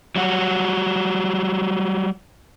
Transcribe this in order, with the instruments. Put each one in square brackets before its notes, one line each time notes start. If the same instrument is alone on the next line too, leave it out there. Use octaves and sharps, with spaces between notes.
[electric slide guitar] F#3 G3 F#4